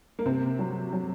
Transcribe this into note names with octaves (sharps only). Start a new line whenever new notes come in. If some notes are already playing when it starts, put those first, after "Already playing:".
A#3
C3 C4
F#3
F#3